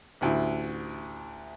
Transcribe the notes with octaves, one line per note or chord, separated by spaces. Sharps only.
A1 D2 E4